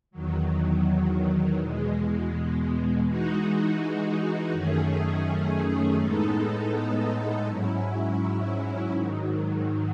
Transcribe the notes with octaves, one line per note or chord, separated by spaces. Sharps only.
E2 D#3 F#3
E2 B2 G#3
E3 G#3 D#4 F#4
F#2 D#3 A3 C#4 G#4
A2 G#3 B3 D#4 A4
G#2 F#3 C#4 E4
G#2 D#3 F#3